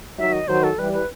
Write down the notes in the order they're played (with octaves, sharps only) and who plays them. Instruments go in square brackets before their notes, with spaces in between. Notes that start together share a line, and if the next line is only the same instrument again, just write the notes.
[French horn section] D#3 F#3 [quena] E5
[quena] D#5
[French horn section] D#3 F#3 [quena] C5
[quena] A4
[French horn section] E3 G3 [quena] B4
[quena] B4